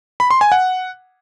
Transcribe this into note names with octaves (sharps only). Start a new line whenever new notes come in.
B5
C6
G#5
F#5